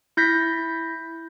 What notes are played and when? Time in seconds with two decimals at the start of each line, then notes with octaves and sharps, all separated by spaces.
0.17 E4 G6 A#6 B6